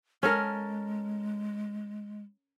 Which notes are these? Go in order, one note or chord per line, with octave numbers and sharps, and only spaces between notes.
G#3 C#4 A4 A#4